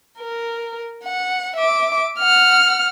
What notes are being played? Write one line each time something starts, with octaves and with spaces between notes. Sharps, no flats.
A#4
F#5
E5 D6
F#5 F6